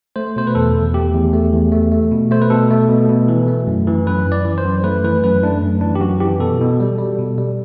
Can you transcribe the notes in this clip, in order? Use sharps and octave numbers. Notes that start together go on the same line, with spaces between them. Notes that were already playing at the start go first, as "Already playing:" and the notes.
A3 C5
B2 C5
B4
E2 A4
E2
A3 G4
E2
A3
E2
A3
A3
B2
A3 C5
B4
B2 A4
A3
B2
B2
E3
A3
F#2
E3
F#2 B4
F#2
D5
E3
C5
F#2
A3 B4
E3 B4
F#2 B4
A3 D4
F#2
E3 D4
G4
F#2 F#4
E3 G4
B2 A4
B2
G3
G3
B2
G3